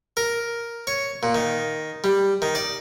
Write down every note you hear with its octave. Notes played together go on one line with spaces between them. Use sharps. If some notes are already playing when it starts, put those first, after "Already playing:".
A#4
C#5
A#2
D#3
G3
D#3
D5